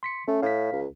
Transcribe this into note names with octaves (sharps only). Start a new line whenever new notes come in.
C6 B6 C#7
A3 C#4
A2 F5 B6
C#2